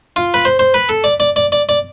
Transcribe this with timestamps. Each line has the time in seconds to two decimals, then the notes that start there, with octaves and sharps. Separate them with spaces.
0.16 F4
0.34 B4
0.45 C5
0.59 C5
0.74 B4
0.89 A4
1.04 D5
1.20 D5
1.36 D5
1.52 D5
1.69 D5